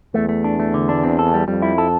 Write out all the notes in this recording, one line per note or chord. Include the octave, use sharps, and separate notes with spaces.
E2 A3
A3
D4
A3
D3
D4
C4
A4
G3
F2 G3
E4
A4